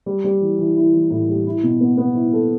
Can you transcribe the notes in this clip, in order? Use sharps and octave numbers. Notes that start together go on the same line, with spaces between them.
G3
G3
E3
E3
E4
E3
A2
G3
E4
B2
B3
B3
E4
A4